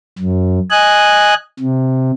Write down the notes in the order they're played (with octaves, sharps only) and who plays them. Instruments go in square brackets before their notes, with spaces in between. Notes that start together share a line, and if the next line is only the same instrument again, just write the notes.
[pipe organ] F#2
D#5 G#5 F#6
C3